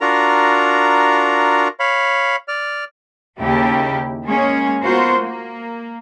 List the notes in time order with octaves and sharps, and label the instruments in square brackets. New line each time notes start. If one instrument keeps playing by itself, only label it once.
[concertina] D4 F4 F#4 A#4 A#5
C#5 F5 B5
D5 F6
[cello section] D#2 C#3 E4 G4
G#3 A#3 C#4 G#4 C#5
B3 F4 F#4 A#4 C5
A#3